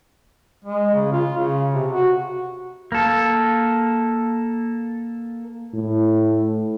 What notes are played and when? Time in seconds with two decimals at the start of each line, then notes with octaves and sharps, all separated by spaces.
0.65 G#3
0.94 C#3
1.12 F4
1.37 C#3
1.75 C3
1.93 F#4
2.92 A#3 A4
5.74 A2